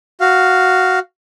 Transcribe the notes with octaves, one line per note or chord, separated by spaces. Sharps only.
F#4 F5